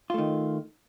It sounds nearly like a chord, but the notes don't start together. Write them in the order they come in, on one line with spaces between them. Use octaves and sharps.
F4 A3 D#3